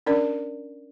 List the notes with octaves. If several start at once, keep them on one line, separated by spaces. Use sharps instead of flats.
C#4 D4 A#4 D5